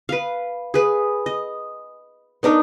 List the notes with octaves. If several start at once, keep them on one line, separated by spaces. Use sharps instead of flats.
B4 F5
G#4 B4
D#5
B3 D4 D#4 A#4